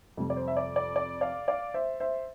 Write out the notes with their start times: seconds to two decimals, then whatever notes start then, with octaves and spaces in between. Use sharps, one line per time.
0.17 F2 C3 G3
0.30 D5
0.37 C5
0.48 E5
0.57 D5
0.76 D5
0.96 D5
1.21 D5 F5
1.48 D5 F5
1.74 C5 E5
2.00 C5 E5